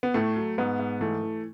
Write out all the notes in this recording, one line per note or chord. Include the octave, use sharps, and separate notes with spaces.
B3
A2 A3
F#3
G#2 B3
G#2
E3 A3
E3